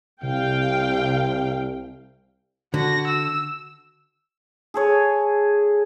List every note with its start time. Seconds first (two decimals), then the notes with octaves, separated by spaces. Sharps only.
0.23 C2 C3 F5 G5
2.74 D3 F#4 A#6
3.08 E6
4.74 G#4 A4 C#5